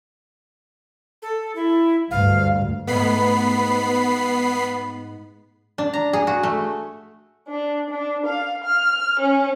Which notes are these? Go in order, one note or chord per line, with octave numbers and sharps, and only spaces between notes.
A4
E4
D2 G2 F5
G#2 A3 B3 B5 C7
D4
A#5
G#4
F#4
A3
D4
D4
F5
F6
C#4